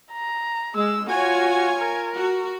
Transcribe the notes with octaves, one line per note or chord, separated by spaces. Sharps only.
A#5
G#3 E6
F4 F#4 C#5 G#5
A#4
F#4